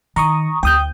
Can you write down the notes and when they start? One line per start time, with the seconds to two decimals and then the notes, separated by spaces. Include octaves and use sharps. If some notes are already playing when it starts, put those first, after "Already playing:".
0.16 D#3 A#5 C#6 D#6
0.63 D2 G5 D#6 G6